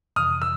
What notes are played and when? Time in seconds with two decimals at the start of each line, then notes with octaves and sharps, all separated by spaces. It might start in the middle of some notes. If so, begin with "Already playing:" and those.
0.16 F2 C3 E3 D#6 F6
0.42 E6